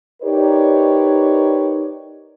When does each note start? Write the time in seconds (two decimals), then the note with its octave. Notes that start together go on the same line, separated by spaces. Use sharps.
0.22 D#4 G4 A#4 B4 C#5 D5